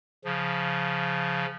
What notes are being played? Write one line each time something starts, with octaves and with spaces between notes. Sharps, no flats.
C#3 F3